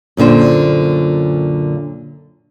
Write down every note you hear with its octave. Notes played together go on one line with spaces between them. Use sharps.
F#2 A#2 D3 C5